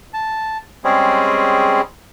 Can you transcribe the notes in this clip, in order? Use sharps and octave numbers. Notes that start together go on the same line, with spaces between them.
A5
G3 G#3 C4 C#4 G#4